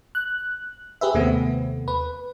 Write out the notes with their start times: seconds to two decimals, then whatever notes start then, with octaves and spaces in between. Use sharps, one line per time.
0.15 F#6
1.01 G4 G#4 B4 E5
1.14 D#2 C3 A3 B3 C4
1.88 B4